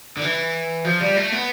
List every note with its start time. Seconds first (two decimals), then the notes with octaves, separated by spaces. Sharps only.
0.17 D3
0.22 E3
0.85 F3
1.00 G3
1.17 A3
1.32 B3